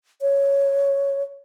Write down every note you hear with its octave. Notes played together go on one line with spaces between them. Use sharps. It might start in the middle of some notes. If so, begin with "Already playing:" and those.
C#5